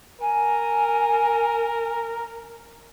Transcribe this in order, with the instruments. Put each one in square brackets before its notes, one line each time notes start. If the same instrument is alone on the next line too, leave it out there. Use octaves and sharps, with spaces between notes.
[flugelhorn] A#4 [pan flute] G#5